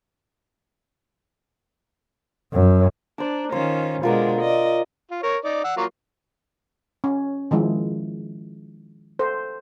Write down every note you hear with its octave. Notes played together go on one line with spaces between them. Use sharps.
F#2
D4 C5 A#5
D#3 C#4 F4 C5
B2 D3 G#3 F4 A#4 D6
D5 D#5
F4
A#4 C#5
D#4 D5
F#5 E6
F#3 A#3 F4
C#4
D#3 F3 G#3 E4
A4 C5